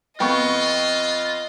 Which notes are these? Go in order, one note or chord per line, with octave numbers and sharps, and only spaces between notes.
F2 B3 F4 D#5 G5 C#6